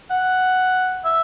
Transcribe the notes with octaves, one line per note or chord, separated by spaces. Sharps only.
F#5
E5